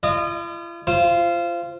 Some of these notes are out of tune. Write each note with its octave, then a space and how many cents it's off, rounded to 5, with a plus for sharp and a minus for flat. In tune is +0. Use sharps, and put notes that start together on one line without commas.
F4 -45 D#5 -30
F4 -25 C5 +0